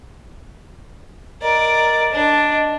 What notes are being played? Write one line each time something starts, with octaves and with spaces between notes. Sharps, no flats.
A#4 D5 D#5
D4